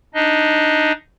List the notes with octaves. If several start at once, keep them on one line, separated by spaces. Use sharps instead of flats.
D4 D#4 D#5